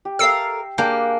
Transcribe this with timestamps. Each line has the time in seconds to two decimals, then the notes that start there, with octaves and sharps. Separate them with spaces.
0.05 G4
0.19 A4 A#4 E5 F5 E6 C7
0.78 A#3 D4 G4 G#4 A#4